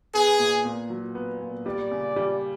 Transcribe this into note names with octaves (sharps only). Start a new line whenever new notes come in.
B3 G#4
A#2
A#2
F#3
B3
A#2
G3 D5
C#3
G3